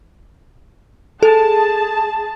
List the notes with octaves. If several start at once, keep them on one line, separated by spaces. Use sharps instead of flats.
G#4 A4 A5